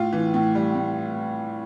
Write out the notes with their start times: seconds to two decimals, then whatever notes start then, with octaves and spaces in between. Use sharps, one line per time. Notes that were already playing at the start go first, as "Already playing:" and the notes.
Already playing: A2 F4 F5
0.13 E3
0.34 A2
0.55 G3
0.75 A2